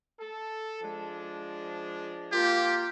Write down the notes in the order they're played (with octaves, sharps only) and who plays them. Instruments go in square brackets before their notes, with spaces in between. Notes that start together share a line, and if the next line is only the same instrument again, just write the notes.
[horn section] A4
F3 G#3 D4
[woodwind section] A#3 F4 [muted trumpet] G4